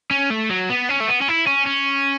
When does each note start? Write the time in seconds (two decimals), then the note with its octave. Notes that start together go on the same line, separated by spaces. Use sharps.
0.11 C#4
0.30 A3
0.50 F#3
0.70 B3
0.89 C#4
1.00 A3
1.08 B3
1.22 C#4
1.29 E4
1.47 C#4
1.67 C#4